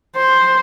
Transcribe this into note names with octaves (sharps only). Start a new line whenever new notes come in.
C5